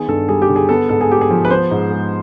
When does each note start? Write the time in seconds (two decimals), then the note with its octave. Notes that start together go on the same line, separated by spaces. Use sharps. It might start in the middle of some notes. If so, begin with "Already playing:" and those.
Already playing: D#3 B3 G#4
0.08 G2 A4
0.29 G3 G#4
0.42 G4
0.49 D3
0.56 G#4
0.69 B3 A4
0.89 G#2 A4
1.01 G#4
1.10 G#3 G4
1.21 G#4
1.30 F3
1.45 B4
1.50 B3 C5
1.71 G#2
1.91 G#3